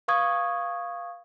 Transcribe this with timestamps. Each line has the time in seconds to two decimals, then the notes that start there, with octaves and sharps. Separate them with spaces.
0.08 B4 F5 C#6 D#6 G#6